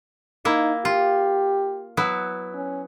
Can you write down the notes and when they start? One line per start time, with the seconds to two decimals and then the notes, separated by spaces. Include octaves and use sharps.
0.45 A#3 D#4 E4
0.85 F4 G4
1.97 F#3 B3 E4
2.54 C#4